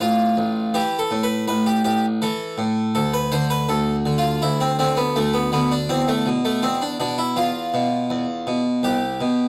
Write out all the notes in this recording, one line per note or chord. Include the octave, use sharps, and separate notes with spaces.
A1 F4
A1
E3 G4
A4
A2
B4
A1 B4
G4
A1 G4
E3 A4
A2
D2 A4
B4
D3 C5
B4
D2 A4
D3
F4
D2 E4
C4
D3 C4
B3
D2 A3
B3
D3 B3
D4
E2 C4
A3
B2
A3
E2 C4
D4
B2 D4
E4
E2 F4
B2
E2
B2
C2 G4
B2